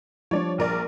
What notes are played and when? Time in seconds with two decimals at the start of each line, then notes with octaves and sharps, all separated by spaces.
0.31 F3 G3 D4 C#5 D5
0.58 A#1 A#4 D5